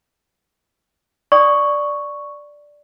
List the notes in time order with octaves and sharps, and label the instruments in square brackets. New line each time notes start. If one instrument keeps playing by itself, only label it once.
[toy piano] D5 D#6 [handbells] C#6